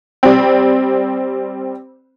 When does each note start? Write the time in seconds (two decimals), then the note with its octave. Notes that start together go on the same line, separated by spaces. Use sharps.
0.23 G3 C4